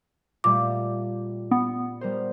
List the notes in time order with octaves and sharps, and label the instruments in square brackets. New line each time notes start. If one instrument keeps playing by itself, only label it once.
[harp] A#2 G3 A3 [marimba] D6
[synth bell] B3
[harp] G3 A#4 C5